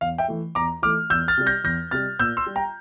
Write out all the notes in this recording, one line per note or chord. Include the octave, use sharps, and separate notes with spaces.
E2 F5
E5 G5
E3 A3
E2 A#5 D6
E3 A3 D6 F6
E2 E6 G6
F6 A6
C3 G3
G6 A#6
E2 G6 A#6
C3 G3 F6 A6
A#2 E6 G6
C6 E6
G3
G5 A#5